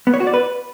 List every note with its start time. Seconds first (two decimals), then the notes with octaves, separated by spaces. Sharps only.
0.07 B3
0.14 C#5
0.20 F#4
0.27 D5
0.34 B4